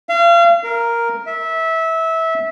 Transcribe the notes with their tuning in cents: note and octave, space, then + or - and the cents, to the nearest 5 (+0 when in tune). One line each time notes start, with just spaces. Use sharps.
F5 -35
A#4 +0
E5 -20